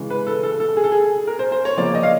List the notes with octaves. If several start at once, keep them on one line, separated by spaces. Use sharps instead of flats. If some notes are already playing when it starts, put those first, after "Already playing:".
Already playing: C#3 E3 G#3
B4
A4
A4
A4
G#4
A4
G#4
A#4
C5
C5
C#5
C#3 F3 A#3 D5
D#5
F5